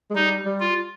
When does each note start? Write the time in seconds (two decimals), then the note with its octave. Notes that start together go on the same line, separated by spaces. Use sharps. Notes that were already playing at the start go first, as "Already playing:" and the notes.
0.10 G#3
0.15 G3 D#4
0.45 G3
0.60 F4